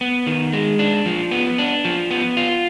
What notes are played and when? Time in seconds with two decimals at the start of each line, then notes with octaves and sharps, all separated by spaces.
0.01 B3
0.27 D#3
0.53 G#3
0.79 D4
1.06 F3
1.31 B3
1.58 D4
1.85 F3
2.11 B3
2.37 F4